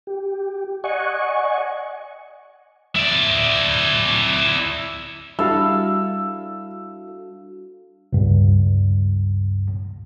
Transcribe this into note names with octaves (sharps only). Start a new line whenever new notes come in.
G4
D5 D#5 F#5 G#5 C#6
E4 D5
G3 D4 E4 F#4 A4 F5 E6
C#2 G2